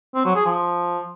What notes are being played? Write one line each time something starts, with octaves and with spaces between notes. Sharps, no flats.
C4
F#3
G#4
F3